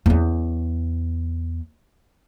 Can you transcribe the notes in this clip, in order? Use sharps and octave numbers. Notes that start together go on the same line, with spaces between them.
E2 C#4